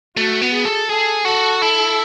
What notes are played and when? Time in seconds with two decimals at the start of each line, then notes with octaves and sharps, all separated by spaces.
0.17 A3 F#4
0.42 B3
0.53 G#4
0.65 A4
0.89 G#4 A4
1.25 F#4 A4
1.62 E4